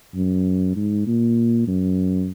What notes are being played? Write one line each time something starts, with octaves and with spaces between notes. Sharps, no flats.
F#2
G#2
A#2
F#2